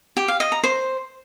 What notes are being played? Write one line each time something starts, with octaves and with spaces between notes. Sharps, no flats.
G4
F5
D#5
A#5
C5